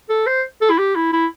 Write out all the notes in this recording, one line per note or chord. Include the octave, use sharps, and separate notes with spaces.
A4
C5
A4
E4
G4
E4
E4